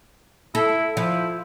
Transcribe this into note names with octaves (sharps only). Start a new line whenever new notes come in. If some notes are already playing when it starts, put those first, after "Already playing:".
E4 A4
F3 E4